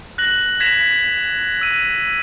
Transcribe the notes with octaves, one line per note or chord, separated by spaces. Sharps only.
F#6 A#6 F#7
G#6 A#6 B6 E7 F7
E6 D#7